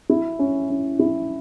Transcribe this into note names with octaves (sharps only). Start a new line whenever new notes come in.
E4
C#4
C#4
E4